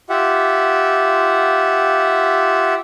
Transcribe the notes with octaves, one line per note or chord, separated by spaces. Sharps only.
F4 G4 E5 F#5